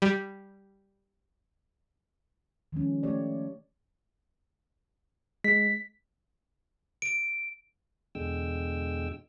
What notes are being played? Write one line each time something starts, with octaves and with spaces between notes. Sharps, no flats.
G3
D#3 F3 G#3 C#4
A3 G4 C#5 D5
G#3 B6
D7
E2 B2 D3 G#3 G5 E6